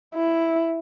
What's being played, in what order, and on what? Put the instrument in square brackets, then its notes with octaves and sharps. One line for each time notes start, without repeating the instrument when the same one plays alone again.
[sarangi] E4